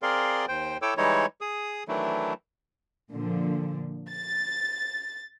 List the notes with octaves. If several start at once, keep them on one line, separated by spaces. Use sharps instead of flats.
C4 G#4 A#4 D5 F5 C6
D#2 C5 G5
E4 A4 C#5 G5 D6 E6
E3 G3 G#3 D#4 E4 C#5
G#4 D#6
D#3 E3 F#3 A3 D4 E4
A#2 D3 F3
A6